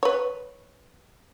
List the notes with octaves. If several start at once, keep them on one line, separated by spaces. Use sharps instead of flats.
B4 C#5